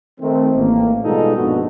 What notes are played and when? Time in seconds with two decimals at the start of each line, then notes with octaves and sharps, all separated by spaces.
0.20 D#3 A3 C4
0.56 A1 A#3
1.04 B2 G3 G#3 D#4 F4 A4
1.36 A#1 G2 B2 B3 F#4